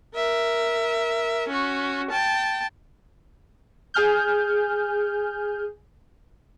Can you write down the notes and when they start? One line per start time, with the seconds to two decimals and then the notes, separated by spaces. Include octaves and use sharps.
0.15 A#4 E5
1.48 C#4 F#4
2.11 G5 A5
3.94 G#4 G#5 F6 G6